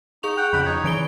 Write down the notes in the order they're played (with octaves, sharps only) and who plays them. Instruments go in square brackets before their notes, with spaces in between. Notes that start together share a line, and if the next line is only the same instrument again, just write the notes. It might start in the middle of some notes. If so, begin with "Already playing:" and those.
[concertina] D#4 [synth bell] G#4 C#6 F7
[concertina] F#5 G5
[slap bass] F2 C#3 [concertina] F#5 G5 B5
[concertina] D#4 C#5
[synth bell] D#3 D7 G7 [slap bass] E3